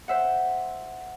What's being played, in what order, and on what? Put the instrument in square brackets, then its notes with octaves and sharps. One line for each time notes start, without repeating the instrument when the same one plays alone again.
[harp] C5 E5 F#5